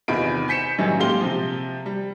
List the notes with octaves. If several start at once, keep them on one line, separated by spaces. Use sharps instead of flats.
E2 C3 D#3 F4 B5 D7
G#5 G6 B6 C#7 E7
F#2 A2 D#3 E3 F#3 G3
A#2 G#3 G4 F5 C6 G7
C3 F3
G3